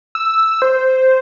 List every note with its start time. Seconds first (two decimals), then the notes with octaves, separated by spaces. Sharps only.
0.15 E6
0.62 C5